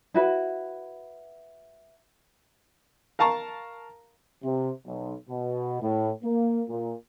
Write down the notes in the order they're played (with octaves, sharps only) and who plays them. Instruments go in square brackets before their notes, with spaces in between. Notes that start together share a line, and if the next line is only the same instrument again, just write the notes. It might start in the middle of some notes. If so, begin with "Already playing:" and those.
[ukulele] E4 F#4 B4
[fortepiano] A#4 F5 A5 A#5 C#6
[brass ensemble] C3
B1
B2
A2
A#3
A#2